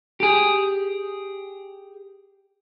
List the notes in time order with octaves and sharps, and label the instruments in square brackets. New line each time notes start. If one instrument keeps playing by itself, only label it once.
[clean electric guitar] G4 G#4